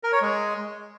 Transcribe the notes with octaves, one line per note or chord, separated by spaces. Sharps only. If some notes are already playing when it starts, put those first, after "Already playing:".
A#4
C#5
G#3